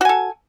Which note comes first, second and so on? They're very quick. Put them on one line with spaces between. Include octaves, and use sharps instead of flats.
F#4 G#5 A4